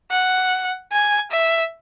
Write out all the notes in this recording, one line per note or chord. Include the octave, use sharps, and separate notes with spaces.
F#5
G#5
E5